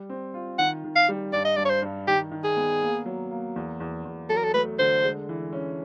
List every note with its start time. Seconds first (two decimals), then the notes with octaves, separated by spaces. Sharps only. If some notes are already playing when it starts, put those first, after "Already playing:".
Already playing: G3
0.10 C4
0.34 F4
0.59 D#3 F#5
0.84 D#3
0.96 F5
1.08 G3
1.33 G2 D5
1.45 D#5
1.56 G2 D5
1.65 C#5
1.70 C5
1.82 G2
2.08 D#3 G4
2.32 D#3
2.44 G#4
2.57 B3
2.82 A#3
3.06 F#3
3.31 A#3
3.56 E2
3.80 E2
4.05 E2
4.30 F#3 A4
4.37 A#4
4.44 A4
4.54 A3 B4
4.79 D3 C5
5.04 G#3
5.29 E3
5.53 C#4